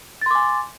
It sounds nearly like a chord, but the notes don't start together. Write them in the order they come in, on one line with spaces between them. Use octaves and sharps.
A6 C6 D6 G#5